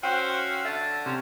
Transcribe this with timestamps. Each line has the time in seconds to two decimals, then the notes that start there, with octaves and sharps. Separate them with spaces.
0.03 C#4 F#4 C5 F5 G5 E6
0.65 D3 E5 A5
1.06 C3 C#4 C5